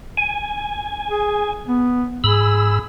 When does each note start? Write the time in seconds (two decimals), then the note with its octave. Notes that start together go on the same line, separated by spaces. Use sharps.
0.17 G#5
1.10 G#4
1.67 B3
2.24 G#2 G#4 B5 E6